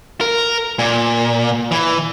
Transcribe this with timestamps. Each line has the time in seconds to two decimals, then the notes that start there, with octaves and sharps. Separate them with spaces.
0.21 A#4
0.79 A#2
1.71 E3